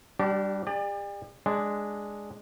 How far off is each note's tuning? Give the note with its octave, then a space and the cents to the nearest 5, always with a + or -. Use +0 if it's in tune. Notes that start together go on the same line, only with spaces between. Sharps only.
G3 +0 D4 +0 G4 -40
G4 +45 D5 +35 A5 +0
G#3 +0 D4 +0 G#5 -30